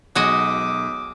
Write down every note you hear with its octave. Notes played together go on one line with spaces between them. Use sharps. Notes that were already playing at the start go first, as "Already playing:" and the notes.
B1 G#3 F#4 D#5 D6 D#6